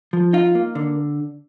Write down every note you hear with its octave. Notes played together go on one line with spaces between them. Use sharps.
F3
D#4 F4
A#3
D3